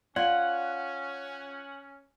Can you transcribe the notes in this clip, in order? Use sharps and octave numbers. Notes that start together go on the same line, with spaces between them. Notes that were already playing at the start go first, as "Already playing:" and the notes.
C#4 F4 D5 F#5